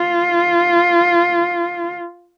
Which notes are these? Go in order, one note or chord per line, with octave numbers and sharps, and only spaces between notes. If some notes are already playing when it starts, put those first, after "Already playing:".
Already playing: F4